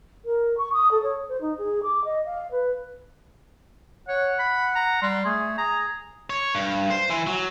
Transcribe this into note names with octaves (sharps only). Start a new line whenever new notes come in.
A#4
C#6
D#6
A4
C#5
C5
D#4
G#4
D6
D#5
F5
B4
C#5 F#5
B5
A#5
G3 C6
A3 G#4
G#4 A#5
C#5
G2
C5
E3
F#3